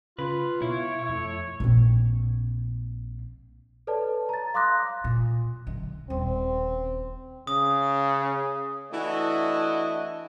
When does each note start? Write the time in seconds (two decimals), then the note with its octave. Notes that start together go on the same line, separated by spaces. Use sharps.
0.19 C#3 F4 B4
0.62 B2 E4 C#5
1.09 F2 A3
1.60 A#1 C4
3.87 A4 B4 C#5 D5 A5
4.29 A#5 A6
4.54 F5 C6 D6 D#6 F#6 A#6
5.04 A#2
5.67 B1 D3
6.10 D#1 C4
7.47 C#3 D#6
8.92 E3 A3 D4 E4 F#4 D#5